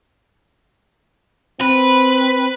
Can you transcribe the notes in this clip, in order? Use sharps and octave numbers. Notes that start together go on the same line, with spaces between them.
C4 B4